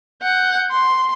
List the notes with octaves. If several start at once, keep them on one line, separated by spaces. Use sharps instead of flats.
F#5 G6
C6